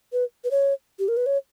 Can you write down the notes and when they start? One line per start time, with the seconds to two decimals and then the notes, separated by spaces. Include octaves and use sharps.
0.13 B4
0.44 B4
0.51 C#5
0.99 G4
1.08 A#4
1.17 B4
1.26 C#5